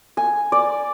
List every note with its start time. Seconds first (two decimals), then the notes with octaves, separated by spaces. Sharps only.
0.17 G#5
0.52 D5